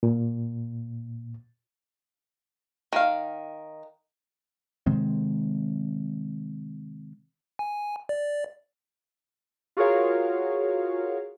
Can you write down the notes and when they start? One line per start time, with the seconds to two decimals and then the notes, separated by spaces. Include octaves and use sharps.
0.03 A#2
2.93 D#3 F5
4.86 C3 D#3 G#3 C4
7.59 G#5
8.09 D5
9.77 F4 F#4 G#4 A#4 C#5 F5